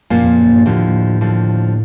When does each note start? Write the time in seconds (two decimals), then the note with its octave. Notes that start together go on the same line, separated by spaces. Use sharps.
0.10 F#2 A#2 F3 A#3
0.24 F2
0.39 F#2
0.52 G2
0.66 D#2 A2 D3 F3
1.21 D#2 D3 F3